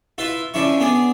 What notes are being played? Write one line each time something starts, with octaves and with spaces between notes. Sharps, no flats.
E4 F4 B4 E5
C#3 F3 D4 E4 C#6
B3 D4 G#4